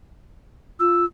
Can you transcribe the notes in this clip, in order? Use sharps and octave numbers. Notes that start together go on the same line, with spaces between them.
F4 E6